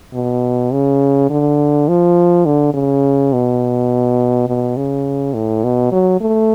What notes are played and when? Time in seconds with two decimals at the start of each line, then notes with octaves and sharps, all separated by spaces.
0.14 B2
0.73 C#3
1.30 D3
1.88 F3
2.46 D3
2.74 C#3
3.33 B2
4.48 B2
4.77 C#3
5.34 A2
5.64 B2
5.92 F#3
6.21 A3